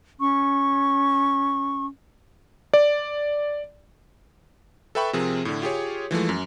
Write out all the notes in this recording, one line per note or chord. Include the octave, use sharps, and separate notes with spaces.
C#4 C#6
D5
A4 B4 E5 G5 B5 C#6
C3 F3 C4 G#4 A#4
A2 D3
F4 G4 G#4 C#5
E3 F3 G#3 A3
F#2